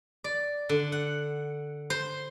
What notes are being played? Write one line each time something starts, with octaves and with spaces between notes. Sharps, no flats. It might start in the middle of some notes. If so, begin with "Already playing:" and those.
D5
D3
F#5
C5